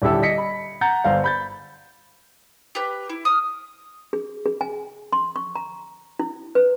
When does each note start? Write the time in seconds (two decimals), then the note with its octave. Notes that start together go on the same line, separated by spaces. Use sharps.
0.02 D#1 D3 E4 G4 A4 E6
0.22 D#5 B6 C#7
0.38 B5
0.81 F#5 A#5 G6 A6 C#7
1.04 G1 C5 F5
1.24 B5 G6 A6
2.75 G4 B4
3.09 E4
3.25 D#6 F6
4.13 G#4
4.46 G#4
4.61 G#5
5.13 C6
5.36 C#6
5.55 A#5
6.19 E4
6.55 B4